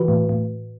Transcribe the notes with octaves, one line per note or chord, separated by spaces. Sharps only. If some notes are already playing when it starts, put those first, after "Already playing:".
Already playing: E3 F#4 B4
A2
A2